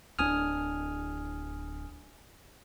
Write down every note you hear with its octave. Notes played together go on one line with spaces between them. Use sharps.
D1 C4 D4 G#5 D#6 F6